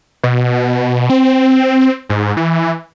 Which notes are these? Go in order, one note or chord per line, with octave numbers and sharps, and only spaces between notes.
B2
C4
G#2
E3